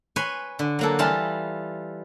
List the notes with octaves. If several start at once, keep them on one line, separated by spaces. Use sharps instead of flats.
B4 C#5 G#5 C6
D3
F#3 A#3 A4
E3 G3 F4 A5